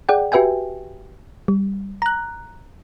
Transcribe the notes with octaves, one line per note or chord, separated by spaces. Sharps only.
G#4 D5 F#5 G5
F#4 G4 B4 E5 G5 G#5
G3
A#5 F#6